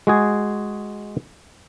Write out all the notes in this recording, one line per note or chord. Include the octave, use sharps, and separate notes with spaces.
G#3 F#4 G#4